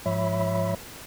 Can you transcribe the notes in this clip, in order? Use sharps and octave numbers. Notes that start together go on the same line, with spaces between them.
G#2 F3 C#5 E5 B5